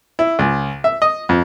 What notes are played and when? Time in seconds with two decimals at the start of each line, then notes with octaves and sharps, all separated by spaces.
0.19 E4
0.39 C#2
0.84 E5
1.02 D#5
1.29 F2